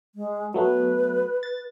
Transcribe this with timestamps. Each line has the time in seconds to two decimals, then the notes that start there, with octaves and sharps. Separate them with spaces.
0.15 G#3
0.54 F#3 A3 B3 B4
1.43 A6